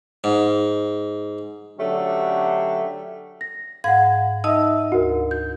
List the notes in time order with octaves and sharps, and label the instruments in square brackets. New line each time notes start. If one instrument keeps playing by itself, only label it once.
[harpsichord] G#2
[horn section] D3 F#3 A3 C#4 D4 G4
[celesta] A#6
[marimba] G#2 G#6 [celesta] F5 F#5
[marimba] D#4 D#5 A5 [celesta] E5 E6
[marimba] D2 [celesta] F#4 A#4
[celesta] G6